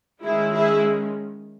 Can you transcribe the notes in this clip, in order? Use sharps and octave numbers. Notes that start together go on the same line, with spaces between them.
D#3 G#3 C#4 E4 G#4
E4 G#4